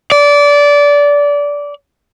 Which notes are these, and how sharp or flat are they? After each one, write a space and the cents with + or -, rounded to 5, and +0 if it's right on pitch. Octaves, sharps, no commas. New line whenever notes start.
D5 -20